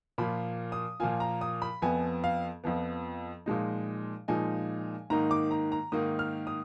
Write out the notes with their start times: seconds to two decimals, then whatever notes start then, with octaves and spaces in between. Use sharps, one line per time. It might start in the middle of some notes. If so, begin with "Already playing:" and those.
0.18 A#2 F3 A#3 F4 B5
0.72 D#6
1.00 A#2 F3 A#3 F4 G#5
1.20 A#5
1.41 D#6
1.62 B5
1.82 F2 F3 B3 G#5
2.24 F5
2.64 F2 F3 B3
3.46 A#2 F3 G#3 D#4
4.28 A#2 F3 G#3 D#4 G#5
5.10 G#2 D#3 A#3 D#4 A#5
5.31 D6
5.51 A#5
5.72 A#5
5.92 G#2 D#3 A#3 D#4 D#6
6.19 F6
6.47 D#6